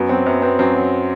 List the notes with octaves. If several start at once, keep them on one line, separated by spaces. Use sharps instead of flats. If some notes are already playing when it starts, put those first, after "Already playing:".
Already playing: F#2 B3
F#3 C4
F#2 B3
B3 C4
F#2 C4
F#3